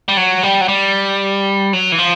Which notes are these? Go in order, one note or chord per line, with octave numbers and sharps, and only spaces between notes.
G3
F#3
G3
F#3
G3
F#3
E3
F3